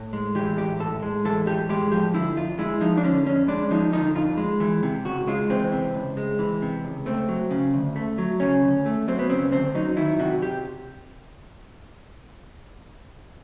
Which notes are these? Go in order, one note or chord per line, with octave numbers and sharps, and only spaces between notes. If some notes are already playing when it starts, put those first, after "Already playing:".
Already playing: A2
G#3
E3 G4
A2 G4
A2 A4
G#3
E3 A4
A2 G4
G#3 G4
F3 G4
D3 E4
F2 F4
G#3 E4
F3 D#4
D4
D3 C#4
F2 C#4
G#3 D4
F3 D#4
D3 D#4
F2 F4
G#3
E3
C3
C#2 F#4
G#3 F4
E3 C4
C3
C#2
G#3
E3
C3
C#2
A3 C4
F#3
C#3
D2
A3
F#3
C#3 C#4
D2
A3
F#3 C4
B3
C#3 C4
D2 C4
F#3 D#4
D#3 E4
C3 F#4
G4